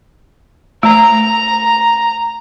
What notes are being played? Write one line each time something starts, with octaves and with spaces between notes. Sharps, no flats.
A3 A#5